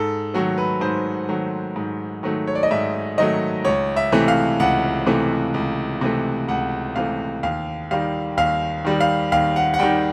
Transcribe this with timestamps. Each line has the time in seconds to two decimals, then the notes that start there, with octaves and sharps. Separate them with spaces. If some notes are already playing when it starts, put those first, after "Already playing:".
Already playing: G#2 A4
0.34 D#3 F#3 A3 F#4
0.58 B4
0.81 G#2 C5
1.29 D#3 F#3 A3
1.76 G#2
2.23 D#3 F#3 A3
2.47 C#5
2.55 D5
2.63 D#5
2.71 G#2 E5
3.18 D#3 F#3 A3 D#5
3.65 C#2 C#5
3.96 E5
4.12 C3 E3 A3
4.28 F5
4.60 C#2 F#5
5.06 C3 E3 A3
5.54 C#2
6.01 C3 E3 A3
6.48 C#2 F#5
6.96 C3 E3 A3 F5
7.43 D#2 F5
7.91 D#3 G3 F5
8.37 D#2 F5
8.85 D#3 G3
9.01 F5
9.32 D#2 F5
9.56 F#5
9.74 F#5
9.79 D#3 G3 G5